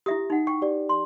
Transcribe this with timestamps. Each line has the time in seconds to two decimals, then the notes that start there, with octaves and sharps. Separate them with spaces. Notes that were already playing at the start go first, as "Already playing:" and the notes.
0.06 E4 G4 E5 D#6
0.30 D#4 F#5
0.47 G5 C#6
0.62 G4 D5
0.89 C6